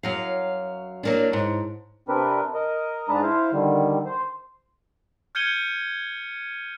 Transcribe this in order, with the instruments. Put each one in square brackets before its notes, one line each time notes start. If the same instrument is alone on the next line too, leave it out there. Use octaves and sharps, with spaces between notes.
[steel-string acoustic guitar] F#2 F#3 F5
F#3 A#3 D4
G#2
[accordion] C3 C4 D4 A#4 B4
A#4 D#5
G#2 G#3 D4 B4 A5 A#5
E4 C5 F5
D3 D#3 G3
C5
[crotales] F6 G6 G#6 C#7 D#7 G7